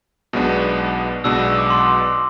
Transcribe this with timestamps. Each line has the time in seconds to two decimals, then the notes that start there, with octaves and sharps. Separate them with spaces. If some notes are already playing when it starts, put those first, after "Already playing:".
0.33 B1 B2 G#3 B3 D4
1.24 B1 B2 G#3 B3 D4 E6
1.58 D6
1.70 C6